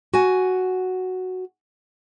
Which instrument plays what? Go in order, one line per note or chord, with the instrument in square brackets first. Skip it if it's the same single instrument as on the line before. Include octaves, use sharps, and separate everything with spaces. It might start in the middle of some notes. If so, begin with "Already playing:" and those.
[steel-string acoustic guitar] F#4 G#5